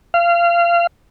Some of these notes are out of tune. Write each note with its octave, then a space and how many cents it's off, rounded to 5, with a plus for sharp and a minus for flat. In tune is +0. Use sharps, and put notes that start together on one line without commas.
F5 -25